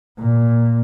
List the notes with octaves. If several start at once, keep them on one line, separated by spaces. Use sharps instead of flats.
A#2